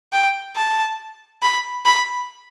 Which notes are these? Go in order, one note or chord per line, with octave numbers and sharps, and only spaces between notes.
G5
A5
B5
B5